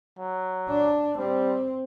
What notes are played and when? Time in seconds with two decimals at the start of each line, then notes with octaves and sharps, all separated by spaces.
0.18 F#3
0.69 D4
1.19 G3 C4